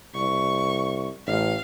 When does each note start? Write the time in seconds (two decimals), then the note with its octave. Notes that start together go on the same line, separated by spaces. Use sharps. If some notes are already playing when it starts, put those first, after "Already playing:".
0.15 C2 C#6
1.27 A1 F5